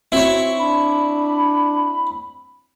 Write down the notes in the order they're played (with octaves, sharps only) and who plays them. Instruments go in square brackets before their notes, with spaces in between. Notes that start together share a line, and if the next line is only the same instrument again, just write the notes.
[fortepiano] C4 [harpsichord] E4 C#5 [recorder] F#4
[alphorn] D4 [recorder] B5